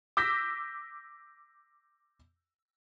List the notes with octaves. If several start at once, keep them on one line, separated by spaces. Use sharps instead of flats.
D6 E6 G6 A#6 B6